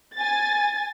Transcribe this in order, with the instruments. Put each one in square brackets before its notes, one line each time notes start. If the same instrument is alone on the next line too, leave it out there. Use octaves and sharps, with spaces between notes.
[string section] G#5 A6